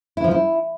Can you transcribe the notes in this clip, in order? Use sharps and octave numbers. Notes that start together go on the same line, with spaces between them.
E4
F3
E4